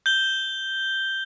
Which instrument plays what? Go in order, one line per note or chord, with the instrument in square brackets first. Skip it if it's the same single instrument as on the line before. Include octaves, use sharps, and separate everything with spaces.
[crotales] G6 G7